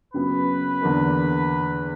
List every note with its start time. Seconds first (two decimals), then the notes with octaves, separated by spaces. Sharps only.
0.14 F#2 C#3 F#3 B3 B4
0.82 E2 D3 A#3 D4 A#4